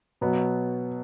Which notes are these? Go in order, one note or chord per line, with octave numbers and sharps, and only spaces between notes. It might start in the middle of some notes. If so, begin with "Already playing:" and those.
B2 F#3 B3